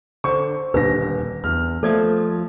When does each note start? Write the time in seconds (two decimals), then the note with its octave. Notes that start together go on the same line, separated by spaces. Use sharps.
0.24 D3 C5 C#6
0.74 D#1 D#2 D3 B4 A#6
1.44 E2 F6
1.83 F3 A3 A4 D5 D#6